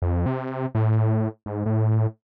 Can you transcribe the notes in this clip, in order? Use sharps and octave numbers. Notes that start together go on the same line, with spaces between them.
F2
C3
A2
G#2
A2